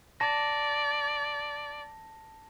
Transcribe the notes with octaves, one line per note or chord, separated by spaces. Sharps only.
D5 A5 A#6